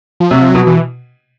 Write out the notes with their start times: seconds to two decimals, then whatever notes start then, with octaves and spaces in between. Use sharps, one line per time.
0.20 F3
0.31 C3 F#3
0.42 F3
0.49 F#3
0.55 B2
0.67 E3